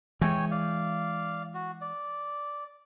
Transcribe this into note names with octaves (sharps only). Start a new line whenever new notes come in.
E3 G#3 C#5 G5 G#5
D5 F5
F#4
D5